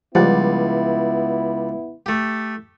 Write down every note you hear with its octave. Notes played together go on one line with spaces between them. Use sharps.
C#2 F3 G3 B3 E4 D5 F#5
A3 G4